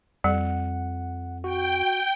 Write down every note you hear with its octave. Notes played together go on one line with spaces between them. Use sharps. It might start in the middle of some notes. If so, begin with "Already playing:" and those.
F2 G3 F#5
F#4 G5